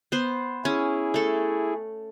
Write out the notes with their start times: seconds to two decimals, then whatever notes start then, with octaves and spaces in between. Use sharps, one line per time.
0.12 B3 C5
0.65 C#4 E4 G#4
1.14 A3 A4